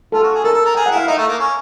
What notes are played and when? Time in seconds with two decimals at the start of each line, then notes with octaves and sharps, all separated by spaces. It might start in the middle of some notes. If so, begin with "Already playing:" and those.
0.12 F4 A4
0.23 F#4
0.34 G#4
0.44 A4 A#4
0.54 A4
0.65 A#4
0.75 G#4 G5
0.86 F#5
0.91 E4
0.96 F5
1.08 D#4 E5
1.18 A3
1.28 A#3
1.39 C#4